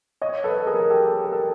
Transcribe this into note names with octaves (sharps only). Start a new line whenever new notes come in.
C#5 D#5
A4 B4
G#4 A#4
A#4
G4 A4
A#4
A4